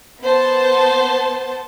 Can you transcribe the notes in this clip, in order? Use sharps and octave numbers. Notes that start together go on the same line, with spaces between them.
B3 C5 A5